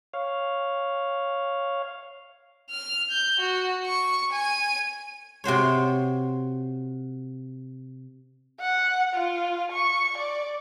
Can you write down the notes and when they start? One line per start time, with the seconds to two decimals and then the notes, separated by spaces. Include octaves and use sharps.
0.14 C#5 F5
2.70 F6
3.11 G6
3.40 F#4
3.86 C#6
4.32 G#5 D#7
5.44 C3 F#4 C5 C#5
8.60 F#5
9.14 F4
9.72 C#6
10.18 D5